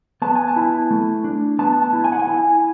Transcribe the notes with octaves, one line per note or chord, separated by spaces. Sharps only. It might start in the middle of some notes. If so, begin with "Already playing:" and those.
B3 A5
G#5
A5
E4
A3
D4
B3 A5
A5
E4
G#5
F#5
G#5
E4